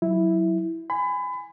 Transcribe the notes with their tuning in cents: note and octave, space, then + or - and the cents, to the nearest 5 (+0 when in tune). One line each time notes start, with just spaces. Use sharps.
F#3 +0 E4 -5
G#5 -10 B5 +30